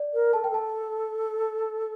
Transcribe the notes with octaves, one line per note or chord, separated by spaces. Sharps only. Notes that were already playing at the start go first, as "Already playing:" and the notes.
Already playing: D5
A#4
A4 A5
A#4 G5
A4 A5